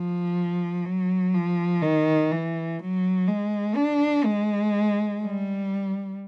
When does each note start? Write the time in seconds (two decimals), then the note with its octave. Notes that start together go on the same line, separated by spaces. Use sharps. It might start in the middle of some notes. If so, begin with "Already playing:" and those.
Already playing: F3
0.85 F#3
1.34 F3
1.82 D#3
2.31 E3
2.79 F#3
3.27 G#3
3.76 D4
4.25 G#3
5.22 G3